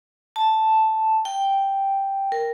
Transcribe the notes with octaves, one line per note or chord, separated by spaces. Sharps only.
A5
G5
A#4